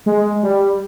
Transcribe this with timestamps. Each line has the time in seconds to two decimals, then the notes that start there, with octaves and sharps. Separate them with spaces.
0.06 G#3
0.43 G3